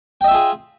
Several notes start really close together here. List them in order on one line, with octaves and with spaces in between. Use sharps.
G5 D#5 E5 F4 G#4